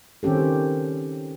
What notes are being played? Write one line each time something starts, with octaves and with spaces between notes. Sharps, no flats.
D#3 C4 C#4 G4 A4